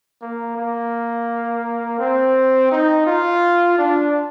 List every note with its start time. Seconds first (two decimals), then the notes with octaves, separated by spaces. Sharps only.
0.22 A#3
0.57 A#3
1.99 C4
2.71 D#4
3.06 F4
3.78 D4